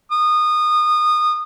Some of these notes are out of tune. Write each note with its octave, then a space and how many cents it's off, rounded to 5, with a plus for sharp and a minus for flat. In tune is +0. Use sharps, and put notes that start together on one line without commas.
D#6 -25